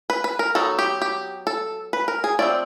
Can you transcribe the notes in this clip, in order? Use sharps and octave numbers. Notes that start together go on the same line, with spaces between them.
B4
B4
A#4
F#3 B3 D#4 A4
G4
G4
A4
B4
A#4
G#4
F3 A3 C4 D5